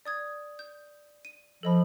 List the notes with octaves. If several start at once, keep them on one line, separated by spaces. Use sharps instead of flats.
D5 D#6 G#6
G6
D#7
F3 A4 D#5 B5